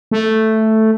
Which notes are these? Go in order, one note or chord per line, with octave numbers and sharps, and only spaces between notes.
A3